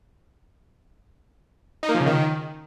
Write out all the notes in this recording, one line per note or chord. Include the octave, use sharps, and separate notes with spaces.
D#4
A#3
F3
C#3
D#3